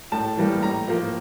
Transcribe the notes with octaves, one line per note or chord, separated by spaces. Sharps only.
A2 A5
E3 G3 A#3
A2 A#5
F3 A#3